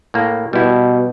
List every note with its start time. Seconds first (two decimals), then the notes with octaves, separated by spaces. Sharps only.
0.14 A2 A#3
0.53 B2 G3 E4